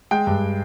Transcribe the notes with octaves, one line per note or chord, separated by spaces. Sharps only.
G#3 G5
G2